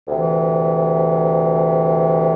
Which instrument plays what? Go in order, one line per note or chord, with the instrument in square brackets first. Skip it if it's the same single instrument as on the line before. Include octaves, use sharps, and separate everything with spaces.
[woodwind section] D2 C3 E3